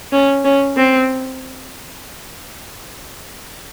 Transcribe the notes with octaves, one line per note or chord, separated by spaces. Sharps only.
C#4
C#4
C4